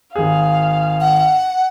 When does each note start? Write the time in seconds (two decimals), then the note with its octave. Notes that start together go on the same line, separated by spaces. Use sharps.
0.16 G#1 G#4 F5
1.01 F#5